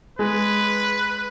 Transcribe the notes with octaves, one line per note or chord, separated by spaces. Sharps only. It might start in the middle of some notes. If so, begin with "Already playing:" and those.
G#3 B4